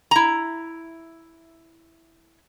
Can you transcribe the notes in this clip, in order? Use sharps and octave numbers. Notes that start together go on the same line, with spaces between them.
E4 A#5